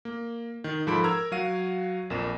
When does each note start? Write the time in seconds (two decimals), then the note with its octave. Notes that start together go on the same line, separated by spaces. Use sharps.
0.05 A#3
0.64 D#3
0.87 G#2 F3 A4 B5 D7
1.04 A#4 A#5 E6 G#6
1.32 F#3 F#4 F5 D#7
2.10 A#1 F2 A#4 E7